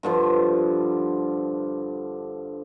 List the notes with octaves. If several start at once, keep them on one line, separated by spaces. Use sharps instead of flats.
G2 D3 F3